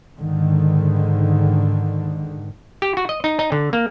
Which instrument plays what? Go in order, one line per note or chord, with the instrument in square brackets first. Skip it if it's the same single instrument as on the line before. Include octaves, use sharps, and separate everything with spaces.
[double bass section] G#2 D3 D#3
[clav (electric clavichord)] G4
F#4
D#5
D#4
D#4
D3
A#3